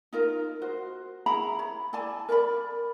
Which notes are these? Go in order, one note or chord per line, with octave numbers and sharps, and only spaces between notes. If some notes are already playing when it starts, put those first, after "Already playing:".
D#4 F4 A#4
F#4 C5
E4 G#4 A#5 B5
C#5
E4 D5 G#5 A5
A#4 D5 G5 B5